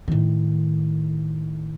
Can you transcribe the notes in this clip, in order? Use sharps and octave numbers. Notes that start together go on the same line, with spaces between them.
A2 D#3